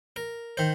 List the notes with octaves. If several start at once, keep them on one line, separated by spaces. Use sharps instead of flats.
A#4
D#3 C5